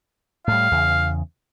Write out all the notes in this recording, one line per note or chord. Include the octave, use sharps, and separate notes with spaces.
A2 G3 F5
E2 C#3